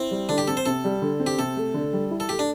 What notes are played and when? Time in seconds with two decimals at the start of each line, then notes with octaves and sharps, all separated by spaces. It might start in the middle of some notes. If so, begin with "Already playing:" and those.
Already playing: C4 E4
0.11 G3
0.29 D3 D4
0.38 G4
0.48 C4 A4
0.57 C5
0.66 C3 A4
0.84 G3
1.02 D3
1.20 C4
1.27 G4
1.38 C3 A4
1.57 A3
1.74 D3
1.93 G3
2.11 E4
2.20 A4
2.29 A3 G4
2.39 D4